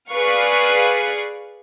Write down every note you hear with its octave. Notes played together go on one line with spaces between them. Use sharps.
G#4 B4 D5 F5 C#6